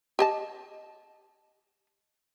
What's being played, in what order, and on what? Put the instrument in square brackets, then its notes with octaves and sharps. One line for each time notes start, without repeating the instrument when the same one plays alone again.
[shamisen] G4 D#5 A5